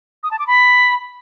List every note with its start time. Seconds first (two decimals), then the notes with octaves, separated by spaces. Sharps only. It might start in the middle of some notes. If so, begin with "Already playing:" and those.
0.23 D#6
0.31 A5
0.39 D6
0.47 B5